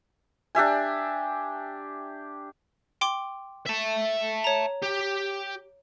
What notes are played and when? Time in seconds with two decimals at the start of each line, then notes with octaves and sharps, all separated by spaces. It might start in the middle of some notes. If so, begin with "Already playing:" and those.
0.55 D4 G4 E5 G#5
3.01 G5 C6 D6
3.66 E5 A5
4.44 C#5 A#5
4.82 G4